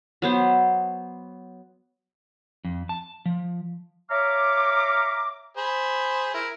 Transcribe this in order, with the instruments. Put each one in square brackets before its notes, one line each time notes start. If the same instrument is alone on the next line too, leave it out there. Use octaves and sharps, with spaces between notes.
[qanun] F#3 B3 C5
[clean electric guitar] F2
A5
F3
[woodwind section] C#5 E5 F5 A#5 D6
[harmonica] G#4 C5 B5
E4 A#4